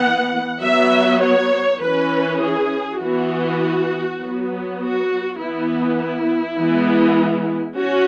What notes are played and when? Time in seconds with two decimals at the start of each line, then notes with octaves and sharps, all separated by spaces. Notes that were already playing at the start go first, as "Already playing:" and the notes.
Already playing: E3 B3 F#5
0.62 F#3 B3 E5
1.22 C#5
1.81 E3 C#4 B4
2.40 G#4
3.00 E3 B3 F#4
4.20 F#3 B3
4.79 F#4
5.38 E3 B3 E4
5.99 E4
6.58 E3 G#3 B3
7.77 C#4 F#4